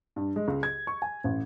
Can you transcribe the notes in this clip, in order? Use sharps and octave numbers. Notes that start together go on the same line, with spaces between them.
G2
G#3
C#2
G#6
C#6
G#5
A1